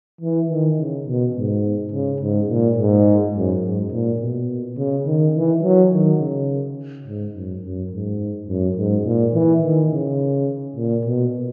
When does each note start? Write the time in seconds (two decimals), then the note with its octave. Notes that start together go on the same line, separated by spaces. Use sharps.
0.21 E3
0.50 D#3
0.78 C#3
1.06 B2
1.35 G#2
1.92 C#3
2.21 G#2
2.49 A#2
2.77 G#2
3.35 F#2
3.63 G#2
3.92 A#2
4.20 B2
4.77 C#3
5.06 D#3
5.35 E3
5.63 F#3
5.92 D#3
6.20 C#3
7.06 G#2
7.34 F#2
7.63 F#2
7.91 G#2
8.48 F#2
8.77 G#2
9.05 A#2
9.34 E3
9.62 D#3
9.91 C#3
10.76 A#2
11.05 B2